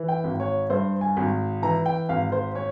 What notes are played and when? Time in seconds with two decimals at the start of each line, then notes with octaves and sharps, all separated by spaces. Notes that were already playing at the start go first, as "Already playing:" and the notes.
Already playing: E3
0.08 G5
0.24 G#1
0.40 C#5
0.70 G2 C5
1.01 G#5
1.17 G#1
1.62 E3 A#5
1.86 G5
2.09 G#1 F5
2.32 C5
2.55 C#5